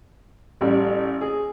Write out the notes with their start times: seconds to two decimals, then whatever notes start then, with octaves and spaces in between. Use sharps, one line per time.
0.61 A1 G3
1.21 G#4